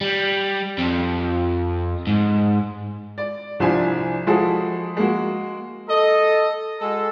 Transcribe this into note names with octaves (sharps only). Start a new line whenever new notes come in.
G3
F2
G#2
D5
C2 F3 D4 E4 C5 G#5
F3 G#3 E4 F#4 G#4 A4
G#3 A#3 F#4
A4 D#5
G#3 F#4 A4